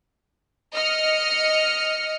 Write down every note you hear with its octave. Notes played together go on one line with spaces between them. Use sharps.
D#5 F6 C#7